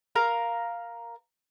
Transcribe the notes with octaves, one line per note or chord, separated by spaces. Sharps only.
A#4 F5 A#5